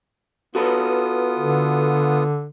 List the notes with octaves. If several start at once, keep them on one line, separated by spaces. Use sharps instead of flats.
B3 F4 F#4 A4 B4 D#6
D3